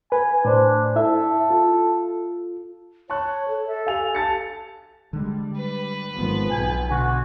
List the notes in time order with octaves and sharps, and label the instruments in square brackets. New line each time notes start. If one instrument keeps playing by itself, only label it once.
[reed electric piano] B4 [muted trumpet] G#5
[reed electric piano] A2 C5 [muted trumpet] D4
[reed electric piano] E4 E5 [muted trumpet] A4
[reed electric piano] F4
[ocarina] C#5 [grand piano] A5 C#6 F#6
[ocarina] A4
[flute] A4 [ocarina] E5
[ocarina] G4 [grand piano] F5 G#5 F7
[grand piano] A5 A6 C#7
[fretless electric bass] D3 G#3 [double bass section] G3
[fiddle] B4
[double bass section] G#1 F3 B3
[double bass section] B1 [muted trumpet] G#5
[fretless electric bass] B2 D3 [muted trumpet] F#4